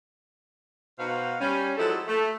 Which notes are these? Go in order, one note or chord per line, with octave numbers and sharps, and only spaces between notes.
B2 D#4 F#4 B4 C5 F5
G3 C#4
F3 F#3 G#3 E4 A4
A3